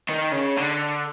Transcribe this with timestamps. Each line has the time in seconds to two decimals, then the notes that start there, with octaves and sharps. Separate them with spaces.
0.10 D#3
0.32 C#3
0.57 D3